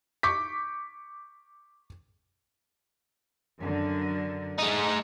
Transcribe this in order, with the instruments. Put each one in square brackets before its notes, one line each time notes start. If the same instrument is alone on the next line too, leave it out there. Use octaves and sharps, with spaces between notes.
[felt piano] C#6 D6 G6 B6
[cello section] F#2 D3 A#4
[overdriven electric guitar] G#3 D#4 [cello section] A3